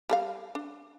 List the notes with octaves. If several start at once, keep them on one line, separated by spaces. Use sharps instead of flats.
G3 A4 F5
D4